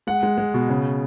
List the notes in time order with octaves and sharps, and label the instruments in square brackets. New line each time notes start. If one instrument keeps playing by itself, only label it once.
[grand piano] G#3 F#5
G#3
G#3
B2
C#3